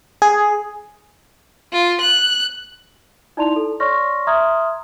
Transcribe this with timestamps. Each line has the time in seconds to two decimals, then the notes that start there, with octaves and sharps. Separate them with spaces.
0.22 G#4
1.72 F4
2.01 F#6
3.37 D#4 E4 D5 A5 C6 F7
3.56 A4
3.80 C#5 D5 C6 C#6 F6 A#6
4.27 E5 A#5 C6 D#6 F6 G#6